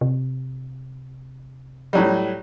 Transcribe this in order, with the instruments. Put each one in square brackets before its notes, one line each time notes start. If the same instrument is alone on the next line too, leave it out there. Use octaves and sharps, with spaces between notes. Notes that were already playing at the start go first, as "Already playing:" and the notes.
[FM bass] C3
[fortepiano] A2 F#3 G3